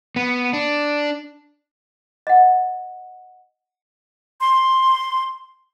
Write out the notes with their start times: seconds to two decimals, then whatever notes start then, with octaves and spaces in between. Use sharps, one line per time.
0.16 B3
0.53 D4
2.27 D#5 F#5
4.41 C6